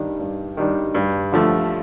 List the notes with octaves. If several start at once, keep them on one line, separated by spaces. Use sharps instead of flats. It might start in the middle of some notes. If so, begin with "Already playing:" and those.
Already playing: G2 D#3 G3 D4
G2
D#3 G3 D4
G2
D3 F3 A3